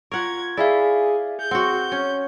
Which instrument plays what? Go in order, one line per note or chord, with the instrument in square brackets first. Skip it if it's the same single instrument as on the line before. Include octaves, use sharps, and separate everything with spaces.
[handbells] F4 C#6 [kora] A#4 F#5 [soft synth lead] G#6
[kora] E4 [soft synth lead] G#4 [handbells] D5 E5 F5
[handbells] G#4 [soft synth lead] G6
[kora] C4 F#4 [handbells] F#5
[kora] C#4